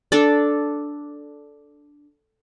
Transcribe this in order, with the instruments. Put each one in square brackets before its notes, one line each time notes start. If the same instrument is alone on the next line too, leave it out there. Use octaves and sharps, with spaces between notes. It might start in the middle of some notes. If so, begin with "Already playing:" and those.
[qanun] D4 A4 D5